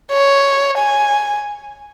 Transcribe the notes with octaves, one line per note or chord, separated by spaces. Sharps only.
C#5
G#5